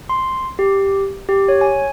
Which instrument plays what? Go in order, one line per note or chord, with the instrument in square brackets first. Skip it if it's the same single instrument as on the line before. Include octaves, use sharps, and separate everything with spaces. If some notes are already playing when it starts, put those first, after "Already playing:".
[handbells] C6
G4
G4
C#5
G#5